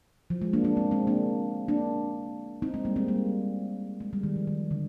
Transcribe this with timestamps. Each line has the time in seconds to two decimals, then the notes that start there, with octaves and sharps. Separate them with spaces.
0.30 F3
0.42 G#3
0.53 A#3 D4
0.64 A#3 D4
0.77 G#3 C4
0.91 G#3 C4
1.07 A#3 D4
1.68 A#3 D4
2.62 C4 D#4
2.74 G#3 C4
2.85 G3 A#3
2.96 G#3 C4
3.08 G3 A#3
4.00 G#3
4.13 G3
4.23 D#3
4.36 F3
4.47 D#3
4.71 D3